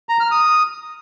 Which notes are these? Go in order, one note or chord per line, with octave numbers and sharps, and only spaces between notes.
A#5
F6
D#6